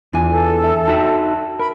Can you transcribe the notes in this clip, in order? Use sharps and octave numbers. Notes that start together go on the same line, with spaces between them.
E2 B3 D4 E4 F4 G#5
A4
E5
D#4 F#4 E5 G5 A5
A#4 B5